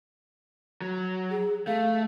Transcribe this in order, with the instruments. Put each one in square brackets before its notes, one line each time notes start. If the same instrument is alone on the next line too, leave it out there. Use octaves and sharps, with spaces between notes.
[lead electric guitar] F#3
[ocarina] G#4
[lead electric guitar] A3 [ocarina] F5